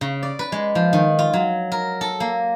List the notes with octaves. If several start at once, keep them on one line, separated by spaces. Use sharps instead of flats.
C#3
D5
B4
G#3
F3
D#3
F4
F#3
A#4
A4
A#3